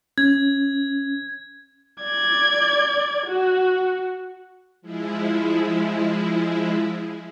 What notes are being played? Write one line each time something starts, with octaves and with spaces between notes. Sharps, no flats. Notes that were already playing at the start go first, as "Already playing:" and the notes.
C#4 G#6
D5 G#6
F#4
F3 G#3 E4